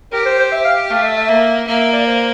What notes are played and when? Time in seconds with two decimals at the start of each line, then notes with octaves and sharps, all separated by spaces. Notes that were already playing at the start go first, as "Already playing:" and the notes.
0.12 G4 A#4
0.25 C5
0.39 C5
0.52 E5
0.65 F5
0.90 A3 F5
1.03 E5
1.16 E5
1.29 A#3
1.67 A#3 E5
1.80 E5
1.92 D5
2.06 C5